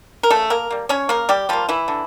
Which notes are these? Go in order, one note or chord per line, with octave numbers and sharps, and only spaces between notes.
A#4
C#3 A3 A4
A#3 A#4
G3 A#3
C#4 C#5
C#3 A#3 A#4
G3 G4
F3 G3 A#3 F4
E3 E4
D3